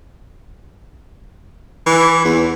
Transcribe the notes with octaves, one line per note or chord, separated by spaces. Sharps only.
E3
E2